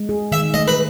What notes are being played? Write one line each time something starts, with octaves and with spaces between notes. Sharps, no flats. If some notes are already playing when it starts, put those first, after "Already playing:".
Already playing: G#3
G#4
D#3 E5
A3 D#5
B4